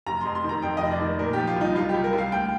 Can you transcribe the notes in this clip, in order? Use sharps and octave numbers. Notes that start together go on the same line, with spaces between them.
F1 A#5
F2 C6
C6
D#3
A#5
F2 G5
F1 D#5
D5
D#3
A#2 A#4
F3 G4
F4
C2 D#4
C2 F4
G4
C2
A#4
C2
F5
D2 G5